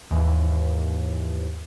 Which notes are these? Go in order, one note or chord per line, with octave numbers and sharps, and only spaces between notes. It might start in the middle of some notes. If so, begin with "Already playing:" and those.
D#2 G#2 E3